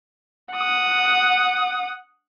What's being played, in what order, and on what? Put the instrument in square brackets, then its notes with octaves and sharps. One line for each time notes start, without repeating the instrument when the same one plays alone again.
[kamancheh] F#5 D#6